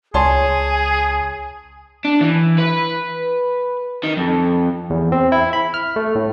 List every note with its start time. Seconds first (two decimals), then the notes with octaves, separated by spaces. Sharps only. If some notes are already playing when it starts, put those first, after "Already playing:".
0.14 C#2 G#4 C#5 G#5 A5 C6
2.04 D4
2.21 E3
2.59 B4
4.03 D#3
4.17 F2
4.90 E2
5.12 C4
5.32 E4
5.53 B5
5.74 F6
5.96 A3
6.15 A2